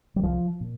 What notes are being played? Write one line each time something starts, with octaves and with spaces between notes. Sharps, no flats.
G3
C2 F3
A#2